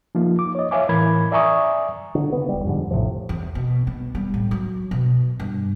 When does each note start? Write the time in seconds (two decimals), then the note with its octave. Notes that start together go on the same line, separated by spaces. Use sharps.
0.15 F3 A#3 D#4 F4
0.39 D6
0.55 C#5 D#5
0.71 C#5 E5 F5 G#5 D6
0.89 A2 E3 A#4 B5 G#6
1.32 D5 E5 G#5 A#5 C#6 D#6
2.15 D3
2.32 C#3 B3
2.49 D#1 G3
2.65 F2 G#2 D3
2.91 A#1 A2 C3 F3
3.29 E2
3.55 B2
3.87 B3
4.15 G3
4.34 A2
4.51 F#3
4.91 B2
5.40 G2